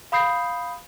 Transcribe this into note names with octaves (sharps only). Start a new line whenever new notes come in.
F5 B5 D#6 G6 C7